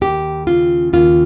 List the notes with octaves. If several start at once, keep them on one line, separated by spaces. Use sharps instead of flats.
D#2 G4
C#3 F4
D#2 F4